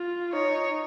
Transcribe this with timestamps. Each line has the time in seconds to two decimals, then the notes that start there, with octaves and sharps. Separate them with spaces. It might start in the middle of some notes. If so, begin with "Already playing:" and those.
Already playing: F4
0.33 D#4 C#5